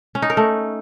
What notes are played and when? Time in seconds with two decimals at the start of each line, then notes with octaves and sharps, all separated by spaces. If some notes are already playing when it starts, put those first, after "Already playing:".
0.15 C#4
0.22 D#4
0.30 A#4
0.37 A3